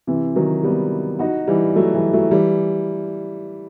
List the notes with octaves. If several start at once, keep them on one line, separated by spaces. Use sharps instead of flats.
C3 E3
D#3 F#3
G3 B3
D#4 F#4
E3 G3
F#3 A3
E3 G3
F#3 A3
E3 G3